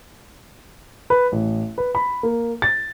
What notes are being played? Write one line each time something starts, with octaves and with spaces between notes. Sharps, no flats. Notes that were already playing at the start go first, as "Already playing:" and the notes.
B4
A1
B4
B5
A#3
A6